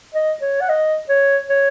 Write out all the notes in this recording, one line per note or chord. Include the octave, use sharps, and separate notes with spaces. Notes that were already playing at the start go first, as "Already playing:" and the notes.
D#5
C#5
F#5
D#5
C#5
C#5